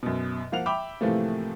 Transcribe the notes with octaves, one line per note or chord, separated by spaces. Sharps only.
F#2 B2
F3 A#3 F5 F#5 F7
E5 G5 B5 D6
A2 C3 E3 F3 A3 A#3